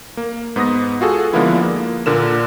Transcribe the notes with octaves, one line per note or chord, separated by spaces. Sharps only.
A#3
G#2 B3 D#6 A#6
F4 F#4 G#4 A4
D3 F3 G#3 A#3 B3 E4
A#3
A#2 D3 A#4 E7